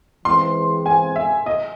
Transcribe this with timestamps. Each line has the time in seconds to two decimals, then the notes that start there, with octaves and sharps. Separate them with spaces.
0.25 E3 G#3 C4 C6
0.86 G#5
1.16 E5
1.46 D#5